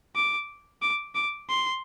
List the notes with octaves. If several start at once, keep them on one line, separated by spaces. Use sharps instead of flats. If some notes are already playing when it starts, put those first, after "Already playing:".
D6
D6
D6
C6